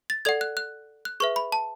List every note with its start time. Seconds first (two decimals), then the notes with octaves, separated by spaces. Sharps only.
0.10 A6
0.25 A4 D5 F#5 G#6
0.41 F#6
0.57 F#6
1.05 F#6
1.20 G#4 B4 E5 C#6
1.36 B5
1.52 A5